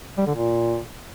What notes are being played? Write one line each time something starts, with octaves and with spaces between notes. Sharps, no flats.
G3
D3
A#2